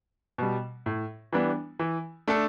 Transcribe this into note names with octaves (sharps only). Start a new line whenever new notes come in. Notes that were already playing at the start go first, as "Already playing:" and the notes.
B2 G3
A2
E3 G3 B3 D4
E3
A3 D4 A4